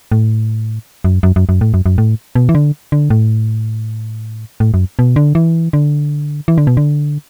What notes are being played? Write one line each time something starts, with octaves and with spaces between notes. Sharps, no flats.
A2
F#2
F#2
F#2
F#2
A2
F#2
F#2
A2
B2
E3
D3
D3
A2
A2
F#2
B2
D3
E3
D3
E3
D3
B2
D3